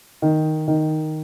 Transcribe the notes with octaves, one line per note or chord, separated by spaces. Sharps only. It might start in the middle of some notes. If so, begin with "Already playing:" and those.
D#3
D#3